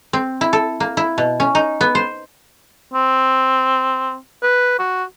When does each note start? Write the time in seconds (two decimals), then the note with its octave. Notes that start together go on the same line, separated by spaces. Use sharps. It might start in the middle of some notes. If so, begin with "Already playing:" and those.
0.13 C4
0.41 E4
0.53 A4
0.80 A#3
0.97 E4
1.18 B2
1.40 C#4
1.55 D#4
1.81 B3
1.95 C5
2.94 C4
4.43 B4
4.79 F#4